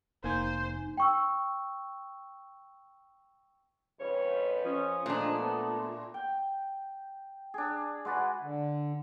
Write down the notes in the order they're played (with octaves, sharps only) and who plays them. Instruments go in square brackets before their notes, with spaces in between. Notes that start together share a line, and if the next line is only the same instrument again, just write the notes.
[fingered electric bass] F1 [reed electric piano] A#3 G#5 G6 [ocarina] D#4 [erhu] C5
[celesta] G5 C#6 E6
[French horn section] F2 B4 [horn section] G#2 C#3 C#5
[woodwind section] F3 D#6 [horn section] C#4
[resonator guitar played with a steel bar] A#2 D4 [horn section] G#3 [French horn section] A3
[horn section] B3
[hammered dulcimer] G5
D4 G#4
G#3 F#4 B4 D5
[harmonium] D3